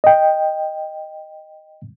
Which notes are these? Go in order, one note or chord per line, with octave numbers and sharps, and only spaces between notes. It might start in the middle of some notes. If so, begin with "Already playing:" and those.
D#5 G5